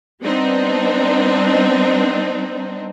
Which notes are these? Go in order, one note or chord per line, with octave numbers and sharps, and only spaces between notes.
G3 B3 C4 D4 D#4